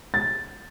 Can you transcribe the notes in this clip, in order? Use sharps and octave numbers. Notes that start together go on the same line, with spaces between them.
A6